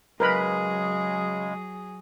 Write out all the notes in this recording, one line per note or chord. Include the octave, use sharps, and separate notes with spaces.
C#3 F#3 G#3 G#4 A#4 B4 B5